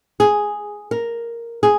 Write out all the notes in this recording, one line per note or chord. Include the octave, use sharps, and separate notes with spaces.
G#4
A#4
G#4